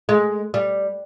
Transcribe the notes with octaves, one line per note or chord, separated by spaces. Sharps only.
G#3
G3